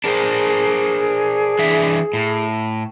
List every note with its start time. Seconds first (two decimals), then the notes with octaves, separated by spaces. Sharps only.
0.04 D4 G#4 A#4 C5
1.59 E3 D4 E5
2.13 A2